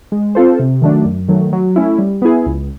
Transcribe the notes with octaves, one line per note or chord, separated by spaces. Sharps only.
G#3
C4 F4 A4 C5
C3
D#3 F#3 A3 D4
F#2
D#3 F#3 A3
F#3
A3 C#4 E4
G3
B3 E4 G#4
C#2